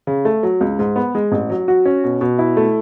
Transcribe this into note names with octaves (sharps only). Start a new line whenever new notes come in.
C#3
A3
F#3
C#2
G#2
B3
G#3
A1
F#3
F#4
C#4
B2
B2
E4
A3